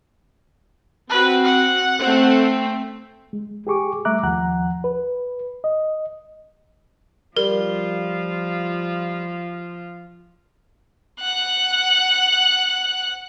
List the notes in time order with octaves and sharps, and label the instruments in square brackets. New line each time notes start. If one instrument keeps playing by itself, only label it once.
[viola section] C4 F#4 [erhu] B4
[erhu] F#5
[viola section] A3 C4
[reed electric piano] G#3
G4 G#4 C#6 D6
G3 A3 E5 A#5 D6 F#6
D#2 F3 F#5 A#5 F#6
B4
D#5
[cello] F3 F4 [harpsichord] G3 [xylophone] A#4
[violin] F#5 F#6